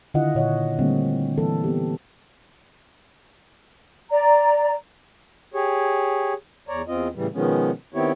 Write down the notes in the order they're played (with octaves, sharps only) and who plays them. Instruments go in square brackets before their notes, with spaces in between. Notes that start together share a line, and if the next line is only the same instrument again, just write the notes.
[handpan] D3 D#3 E4 F4 D#5 F#5
A#2 C#5 D#5 F#5
D3 G3 A3 A#3 C4
E3 A#3 A4
B3 G4
[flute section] D5 A#5
[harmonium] G4 G#4 C#5
E2 C#5 D5 A#5
E2 C4 F4 D#5
A2 C#3 E3 G3
B2 D#3 F3 G#3 B3 C#4
D#3 B3 C4 E4 G4 C#5